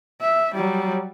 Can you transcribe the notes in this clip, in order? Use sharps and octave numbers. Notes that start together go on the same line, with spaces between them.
E5
F#3 G3